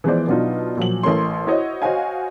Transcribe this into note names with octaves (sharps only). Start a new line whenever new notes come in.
E3 F3 G#3 B3 C5 D5
B2 F#3 B3 D4 D#4 F4
A#2 F3 F#3 F#7
A1 A3 A#4 C#5 C6
E4 F#4 C5 C#5 D#5
F#4 C5 C#5 D#5 F5 G#5